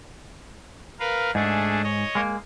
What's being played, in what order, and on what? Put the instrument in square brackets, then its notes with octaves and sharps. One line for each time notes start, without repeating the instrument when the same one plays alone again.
[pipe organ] A#4 B4 F5
[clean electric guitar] G#2 [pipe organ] A3 D4 G#4
[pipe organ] C#5 D#5
[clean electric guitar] G#3 A#3